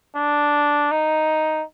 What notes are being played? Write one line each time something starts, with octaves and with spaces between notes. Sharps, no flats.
D4
D#4